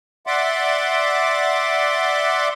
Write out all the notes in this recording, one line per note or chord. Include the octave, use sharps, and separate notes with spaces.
D5 E5 F#5 C6 D6